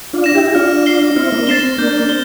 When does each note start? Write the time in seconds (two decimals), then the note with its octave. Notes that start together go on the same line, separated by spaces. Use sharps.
0.13 D4 F4
0.24 A#6 E7
0.34 E4 G4
0.54 D4 F4 F6
0.86 C7 G7
1.16 C4 E4 F6
1.32 A#3 D4
1.43 D4
1.47 C4 A6 C7 E7 G7
1.63 C4
1.78 A#3 D4 G6
2.00 A#3
2.09 C4 G7